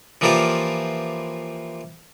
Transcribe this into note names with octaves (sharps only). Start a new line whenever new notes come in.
E3 F3 A#3 F4 G4 D5